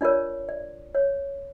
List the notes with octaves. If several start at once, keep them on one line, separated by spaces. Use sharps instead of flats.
D4 F4 A#4 C#5 D5
D5
C#5